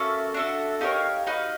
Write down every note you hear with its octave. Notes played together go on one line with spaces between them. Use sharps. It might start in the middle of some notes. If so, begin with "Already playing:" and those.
Already playing: A#3 C#4 F#4 A4 E5
D4 F#4 A4 E5
D#4 G4 A#4 C#5 F5
D#4 F#4 B4 D#5 F5